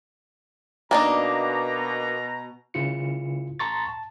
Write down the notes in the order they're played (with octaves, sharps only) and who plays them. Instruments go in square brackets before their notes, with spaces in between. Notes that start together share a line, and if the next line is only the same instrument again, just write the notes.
[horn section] B2 A#5 [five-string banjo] A#3 D4 D#4
[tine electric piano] C#3 E4 F4 C#7
A5 A#5 C6 C#6 A6
A5